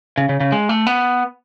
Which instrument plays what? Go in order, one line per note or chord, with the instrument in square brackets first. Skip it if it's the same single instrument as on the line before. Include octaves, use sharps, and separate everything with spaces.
[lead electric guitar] C#3
C#3
C#3
G#3
A3
B3